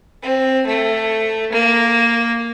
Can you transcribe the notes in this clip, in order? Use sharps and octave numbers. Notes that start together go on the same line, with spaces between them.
C4
A3
A#3